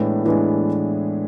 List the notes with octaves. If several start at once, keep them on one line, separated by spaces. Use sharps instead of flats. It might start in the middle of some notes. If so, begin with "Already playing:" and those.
Already playing: A2 E3 G#3 B3 D4
A2 E3 G#3 B3 D4